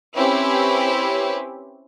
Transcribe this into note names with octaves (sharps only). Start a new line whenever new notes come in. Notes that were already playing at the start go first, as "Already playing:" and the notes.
C4 C#4 E4 G4 B4 C#5